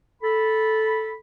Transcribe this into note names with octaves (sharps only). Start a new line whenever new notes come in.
A4 B5